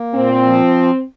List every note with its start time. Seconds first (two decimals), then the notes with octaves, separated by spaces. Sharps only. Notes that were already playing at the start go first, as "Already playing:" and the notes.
Already playing: A#3
0.15 A#2 C4
0.45 F3